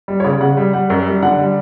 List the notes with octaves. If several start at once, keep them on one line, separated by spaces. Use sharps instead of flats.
G3
C#5
C#3 D5
C#3 F#5
G3
G3 F#5
F#2
G3
D3 F#5
G3